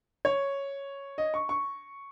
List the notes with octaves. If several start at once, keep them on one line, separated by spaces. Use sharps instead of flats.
C#5
D#5
C#6
C#6